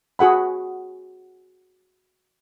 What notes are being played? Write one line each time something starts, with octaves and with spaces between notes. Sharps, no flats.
F#4 G#4 F#5 B5